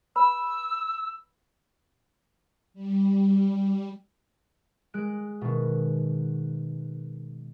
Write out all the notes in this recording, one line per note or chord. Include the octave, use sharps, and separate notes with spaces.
B4 B5 E6
G3
G#3 F#6 D7
B2 D#3